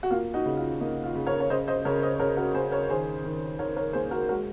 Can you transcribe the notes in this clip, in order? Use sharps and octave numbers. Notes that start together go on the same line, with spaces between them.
F#4
A#3 F4
D#4 F#4
C#3
F4
A#3 D#4
F4
C#3
A#4 C#5
C#5
C#3 C5 D#5
C5 D#5
C#3 A#4 C#5
C5 D#5
C#3 A#4 C#5
F#4 A#4
C#3 G#4 C5
A#4 C#5
D#3 G#4 C5
D#3
D#3 A#4 C#5
A#4 C#5
A#3 G#4 C5
F#4 A#4
G#3 F#4 A#4